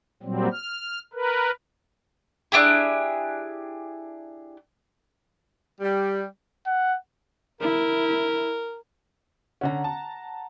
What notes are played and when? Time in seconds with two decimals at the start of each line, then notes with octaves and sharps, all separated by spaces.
0.23 A#2 F#3 G3 C4
0.52 F6
1.14 A#4 B4
2.52 D4 E4 G4 G#4
5.81 G3
6.67 F#5
7.61 E4 A#4
9.61 D3 C#4 F#5 A#5
9.84 A5